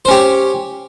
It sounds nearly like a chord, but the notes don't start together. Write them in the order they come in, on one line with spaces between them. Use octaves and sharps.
C5 C#4 G4